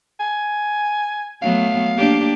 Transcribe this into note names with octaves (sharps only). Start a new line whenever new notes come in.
G#5
F#3 A3 B3 F5
A#3 D4 G4